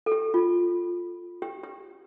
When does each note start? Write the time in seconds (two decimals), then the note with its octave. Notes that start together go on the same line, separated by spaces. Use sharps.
0.06 A4
0.12 G4
0.34 F4
1.42 G4
1.64 G4